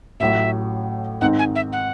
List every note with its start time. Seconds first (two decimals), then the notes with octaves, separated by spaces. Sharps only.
0.20 A1 A2 F#3 E5
1.21 G#2 D#3 G#3 C4 D#4 F#5
1.39 G#5
1.55 E5
1.72 F#5